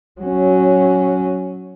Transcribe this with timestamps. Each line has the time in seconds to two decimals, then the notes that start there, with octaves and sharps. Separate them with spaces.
0.21 F#3 C#4